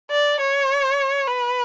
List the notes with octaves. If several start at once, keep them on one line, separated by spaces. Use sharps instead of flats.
D5
C#5
B4